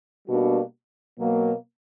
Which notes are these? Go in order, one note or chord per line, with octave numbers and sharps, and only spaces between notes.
B2 G3 A#3 D4 F#4
B2 F#3 A#3